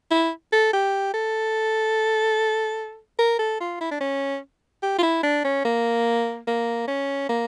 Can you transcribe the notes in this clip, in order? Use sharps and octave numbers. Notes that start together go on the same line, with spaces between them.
E4
A4
G4
A4
A#4
A4
F4
E4
D4
C#4
G4
F4
E4
D4
C#4
A#3
A#3
C#4
A#3